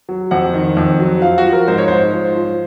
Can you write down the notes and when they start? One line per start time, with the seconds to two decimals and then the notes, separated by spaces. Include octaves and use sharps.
0.09 F#3
0.31 F2 F#5
0.54 D#3
0.77 F2
0.99 F#3
1.22 F3 F5
1.38 F#4
1.45 F3
1.53 A#4
1.68 G#2 C5
1.78 C#5
1.88 G#2 C5
2.13 F3
2.36 F3